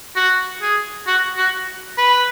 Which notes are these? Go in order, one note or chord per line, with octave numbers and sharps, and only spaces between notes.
F#4
G#4
F#4
F#4
B4